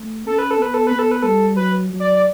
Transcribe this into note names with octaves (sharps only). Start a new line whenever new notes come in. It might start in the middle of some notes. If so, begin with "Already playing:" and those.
Already playing: A3
C#4 A4
B4
A4
B3 B4
A4
B3 B4
A4
B4
G3 A4
F#3 B4
F#3
D5
D5